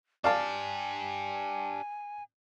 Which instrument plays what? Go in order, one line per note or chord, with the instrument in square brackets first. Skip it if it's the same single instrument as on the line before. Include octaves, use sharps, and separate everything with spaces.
[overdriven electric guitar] D4 G4 [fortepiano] D5 F5 A5 [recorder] G#5